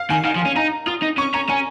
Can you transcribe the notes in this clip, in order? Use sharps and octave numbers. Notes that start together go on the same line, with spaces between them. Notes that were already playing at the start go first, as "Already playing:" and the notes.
Already playing: F5
D#3 G#5
D#3 F5
F3
C#4 G#5
D#4 A#5
F4 D#6
D#4
C#4 C#6
C#4 A#5
C#4 G#5